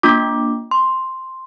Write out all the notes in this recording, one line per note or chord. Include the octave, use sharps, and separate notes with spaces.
A#3 D4 F4 D6
C6